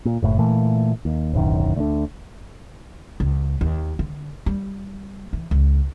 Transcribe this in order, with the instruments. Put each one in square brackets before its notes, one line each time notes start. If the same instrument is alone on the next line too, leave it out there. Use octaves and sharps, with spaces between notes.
[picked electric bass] A#2
F#1 A2
A#2 E3 A3
D#2
D1 B1 F#2 D#3
D2 D3
[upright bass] C#2
D#2
D3
G3
E3
C#2